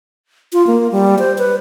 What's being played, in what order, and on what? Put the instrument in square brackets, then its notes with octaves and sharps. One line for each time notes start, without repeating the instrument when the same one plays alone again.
[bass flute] F4
A#3
G3
C5
B4